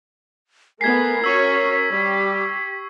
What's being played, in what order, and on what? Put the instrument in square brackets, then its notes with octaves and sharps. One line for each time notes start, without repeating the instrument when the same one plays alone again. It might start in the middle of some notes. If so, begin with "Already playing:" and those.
[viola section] A3 B3 [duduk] A#4 [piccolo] G#5 [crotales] G#6 B6 C7
[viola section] C#4 F#4 C#5 [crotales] C#6 E6 [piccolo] B6
[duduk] G3 [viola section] G4